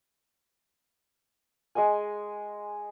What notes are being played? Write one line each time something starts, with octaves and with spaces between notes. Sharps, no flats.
G#3 D#5 F#5 G#5